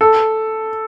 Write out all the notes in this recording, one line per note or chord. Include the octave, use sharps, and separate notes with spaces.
A4